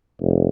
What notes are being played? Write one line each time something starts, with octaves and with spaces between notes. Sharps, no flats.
F1